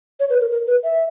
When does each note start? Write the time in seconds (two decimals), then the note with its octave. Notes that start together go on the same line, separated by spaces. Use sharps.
0.20 C#5
0.30 B4
0.41 A#4
0.51 A#4
0.67 B4
0.84 E5